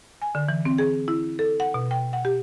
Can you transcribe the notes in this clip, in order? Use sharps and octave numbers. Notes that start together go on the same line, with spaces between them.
G#5
D3
E3
C4
G#4
E4
A4
F#5
B2
G5
F#5
G4